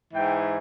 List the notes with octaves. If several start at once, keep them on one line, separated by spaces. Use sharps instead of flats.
G#2 E3 G5